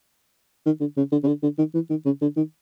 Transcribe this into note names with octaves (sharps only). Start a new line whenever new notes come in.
D#3
D3
C#3
D3
C#3
D3
D3
D#3
E3
D#3
C#3
D3
D#3